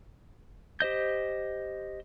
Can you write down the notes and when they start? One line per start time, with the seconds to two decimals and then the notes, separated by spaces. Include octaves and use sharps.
0.80 G4 C5 D#5 G6